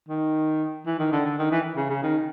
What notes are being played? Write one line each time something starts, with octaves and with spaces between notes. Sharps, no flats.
D#3
E3
D#3
D3
D3
D#3
E3
C#3
C#3
D#3